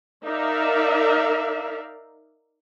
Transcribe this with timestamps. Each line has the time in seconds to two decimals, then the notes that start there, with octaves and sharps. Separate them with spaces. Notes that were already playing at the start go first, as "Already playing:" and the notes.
0.24 D#4 A#4 D5 E5 F5